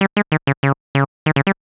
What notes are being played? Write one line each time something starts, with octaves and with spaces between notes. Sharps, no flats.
G3
G#3
D#3
C#3
C#3
C#3
D#3
C#3
G3